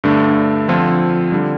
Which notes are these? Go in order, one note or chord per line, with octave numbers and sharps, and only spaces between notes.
G2 D3 A3 D4
D3 F3 C4 F4 A4
D3 G3